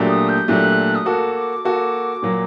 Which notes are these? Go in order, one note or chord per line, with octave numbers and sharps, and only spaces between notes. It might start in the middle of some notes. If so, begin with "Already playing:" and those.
Already playing: A#2 F#3 A3 D4 G4
D#6
G6
A#2 F#3 A3 D4 G4 F#6
D#6
A#3 F#4 A4 D6
D6
A#3 F#4 A4
A#2 F#3 A#3